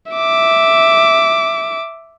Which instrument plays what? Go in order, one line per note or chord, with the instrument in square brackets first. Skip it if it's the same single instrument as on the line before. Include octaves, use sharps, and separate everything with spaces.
[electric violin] E5 D6